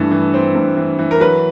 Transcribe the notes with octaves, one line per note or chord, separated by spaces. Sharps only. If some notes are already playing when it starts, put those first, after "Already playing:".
Already playing: G2 E3 A3
E3
C4
G2
E3
E3
A#4
F#3 B4